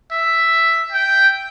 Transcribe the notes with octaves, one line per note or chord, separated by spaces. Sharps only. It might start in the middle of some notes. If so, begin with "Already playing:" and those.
E5
G5